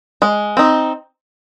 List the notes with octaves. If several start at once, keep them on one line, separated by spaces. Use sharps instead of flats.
G#3
C4 D#4